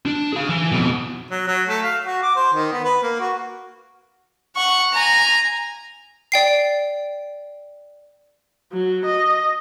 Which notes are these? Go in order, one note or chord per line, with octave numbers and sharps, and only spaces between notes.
D4
G#4 F5
E3
F2 B2
F#3
F#3
A3
F5
F#4
D6
C5
D#3
B3
B4
A#3
F#4
F#5 C#6
G#5 A#5
D5 G5 C7
F#3
D#5